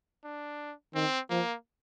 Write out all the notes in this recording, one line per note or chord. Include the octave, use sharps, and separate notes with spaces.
D4
D#3 C4
F3 A#3